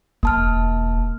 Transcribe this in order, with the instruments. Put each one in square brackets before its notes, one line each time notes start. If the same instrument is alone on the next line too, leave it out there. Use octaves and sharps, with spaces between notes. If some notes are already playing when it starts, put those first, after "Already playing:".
[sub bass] E1 [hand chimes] A#3 A5 F6